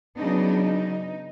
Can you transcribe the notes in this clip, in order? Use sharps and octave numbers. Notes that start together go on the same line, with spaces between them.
C#3 F#3 B3 D4 D#4
D#4